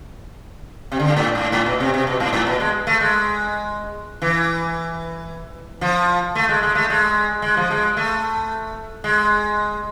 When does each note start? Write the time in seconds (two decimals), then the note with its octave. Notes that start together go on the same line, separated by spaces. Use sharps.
0.92 C3
0.99 D3
1.10 G#2
1.16 A2
1.35 G#2
1.52 A2
1.66 B2
1.80 C3
1.94 C3
2.07 B2
2.20 G#2
2.33 A2
2.47 B2
2.60 G#3
2.87 A3
3.01 G#3
4.22 E3
5.81 F3
6.35 A3
6.49 G#3
6.63 G#3
6.75 A3
6.90 G#3
7.42 G#3
7.57 F3
7.71 G#3
7.97 A3
9.04 G#3